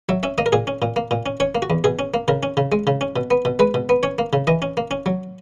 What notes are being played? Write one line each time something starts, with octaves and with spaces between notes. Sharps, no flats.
F#3 E5
C#4 E5
A#3 D#5
A#4
A#2 G#4
C#4
A#2
A#3
A#2
C#4
C#4 C#5
A#3
F#4
E2
B2 G#4
C#4
A#3
C#3 A#4
C#4
C#3
G#3
C#3
C#4
B2
B3
B2
G#3 B4
B2
B3
C#4 C#5
A#3
C#3
E3 D#5
C#4
A#3
C#4
F#3